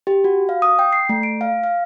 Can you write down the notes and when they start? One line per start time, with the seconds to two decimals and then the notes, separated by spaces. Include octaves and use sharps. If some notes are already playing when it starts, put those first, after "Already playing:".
0.07 G4
0.24 F#4
0.49 F5
0.62 D#6
0.79 G5
0.93 C7
1.09 A3
1.23 D7
1.41 F5
1.63 F5